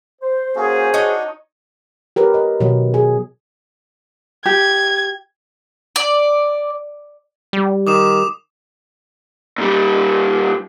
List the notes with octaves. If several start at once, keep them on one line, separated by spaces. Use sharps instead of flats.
C5
A#3 C#4 F#4 G#4
D4 D#4 F#4 C#5 D#5
G4 A#4 B4 C#5
D#5
B2 D#3 F#3 B3
G#4
G4 G#6
D5
G3
D#3 D6 D#6 E7
A#2 G3